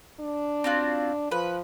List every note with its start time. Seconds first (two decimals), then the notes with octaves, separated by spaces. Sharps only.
0.20 D4
0.64 C4 F4 F#4
1.31 F3 B4